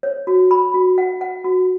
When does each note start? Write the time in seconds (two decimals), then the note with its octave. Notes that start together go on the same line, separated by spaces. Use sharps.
0.03 C#5
0.27 F#4
0.51 B5
0.74 F#4
0.98 F#5
1.21 F#5
1.44 F#4